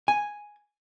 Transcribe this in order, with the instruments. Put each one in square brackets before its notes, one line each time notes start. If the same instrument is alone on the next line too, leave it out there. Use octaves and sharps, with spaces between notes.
[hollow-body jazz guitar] G#5